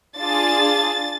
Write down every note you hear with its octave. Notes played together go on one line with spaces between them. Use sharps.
D4 F4 G#4 A6